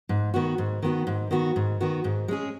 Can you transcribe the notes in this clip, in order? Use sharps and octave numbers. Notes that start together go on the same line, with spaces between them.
G#2
D#3 B3 F#4
G#2
D#3 B3 F#4
G#2
D#3 B3 F#4
G#2
D#3 B3 F#4
G#2
G#3 C#4 G#4